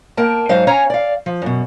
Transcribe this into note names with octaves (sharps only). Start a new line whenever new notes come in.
A#3 A#4 G5 A5
G#2 F#3 D#4 C5 D#5 F5
C#4 C#5 F5 G#5 A#5
D5 F5
F3
F#2 B2